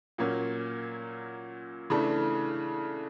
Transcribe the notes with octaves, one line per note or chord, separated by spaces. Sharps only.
A#2 F#3 A#3 C#4
C#3 E3 A3 D4